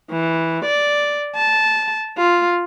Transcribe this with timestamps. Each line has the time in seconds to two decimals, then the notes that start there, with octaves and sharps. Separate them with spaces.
0.11 E3
0.65 D5
1.36 A5
2.18 F4